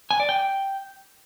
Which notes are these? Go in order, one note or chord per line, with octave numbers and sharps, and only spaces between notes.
G#5
D5
G5